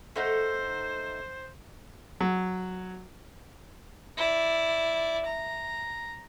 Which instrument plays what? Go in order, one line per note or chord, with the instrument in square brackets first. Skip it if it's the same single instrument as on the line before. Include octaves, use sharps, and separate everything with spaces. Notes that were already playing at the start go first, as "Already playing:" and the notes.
[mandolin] A3 D#4 F#5 [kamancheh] C5
[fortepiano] F#3
[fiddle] E4 D5
A#5